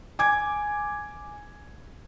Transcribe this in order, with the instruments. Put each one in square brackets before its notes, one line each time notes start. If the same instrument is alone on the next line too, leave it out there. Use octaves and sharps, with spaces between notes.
[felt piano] G#5 D6 G#6